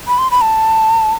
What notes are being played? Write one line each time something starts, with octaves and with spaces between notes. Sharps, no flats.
B5
C6
B5
A5